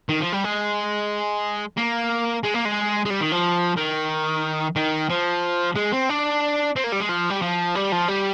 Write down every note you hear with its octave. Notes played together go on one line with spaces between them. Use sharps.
D#3
F3
G3
G#3
A#3
G#3
A#3
G#3
G#3
G3
D#3
F3
D#3
D#3
F3
G#3
C4
D4
C4
A#3
G3
G#3
F3
G3
F3
G3
F3
G3